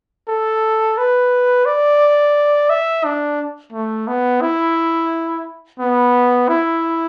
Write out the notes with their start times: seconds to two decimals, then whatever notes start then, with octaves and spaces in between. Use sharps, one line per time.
0.28 A4
0.98 B4
1.65 D5
2.70 E5
3.05 D4
3.72 A3
4.07 B3
4.41 E4
5.79 B3
6.48 E4